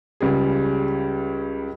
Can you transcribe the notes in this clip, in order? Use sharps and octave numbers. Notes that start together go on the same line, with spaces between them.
C#2 C#3 G3 G#4